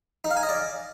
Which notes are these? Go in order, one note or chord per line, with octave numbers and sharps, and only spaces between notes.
D#4
F5
G#5
D#5
D5